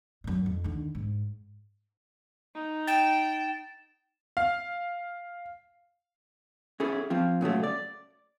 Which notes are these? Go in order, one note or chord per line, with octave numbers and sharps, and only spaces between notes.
F#2 A2
F2
D#2 D3
G#2
D#4
G5 A6 E7
F5
C#4 E4 G#4 A4
F3 C4 F4
A#2 C#3 F#3 A3
D5